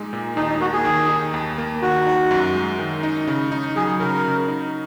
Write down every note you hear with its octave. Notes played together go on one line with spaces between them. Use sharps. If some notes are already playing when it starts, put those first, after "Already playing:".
Already playing: A#2 G#3 D#4
A#2
D#2 D#4
D#4
A#3 F#4
G#4
D#3
D#4
D#2
A#3
D#3 F#4
D#4
F#2
G#3
D#3
D#4
C#3
D#4
F#3 G#4
C#3 A#4
C#3
D#4